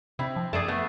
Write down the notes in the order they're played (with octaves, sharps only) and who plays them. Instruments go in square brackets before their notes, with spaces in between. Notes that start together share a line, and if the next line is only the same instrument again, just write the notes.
[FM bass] C3 [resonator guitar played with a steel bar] C4 [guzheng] E4
[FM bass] F3
[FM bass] F#2 [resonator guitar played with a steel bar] A3 [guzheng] G#4 D5 A5
[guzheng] A3 [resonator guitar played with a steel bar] B3